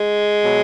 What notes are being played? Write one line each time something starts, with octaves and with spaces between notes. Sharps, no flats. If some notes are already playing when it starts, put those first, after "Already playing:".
Already playing: G#3
B2 F#3